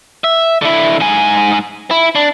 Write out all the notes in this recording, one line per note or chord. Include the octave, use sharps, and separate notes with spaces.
E5
D3 E4
G#2 G#5
E4
D4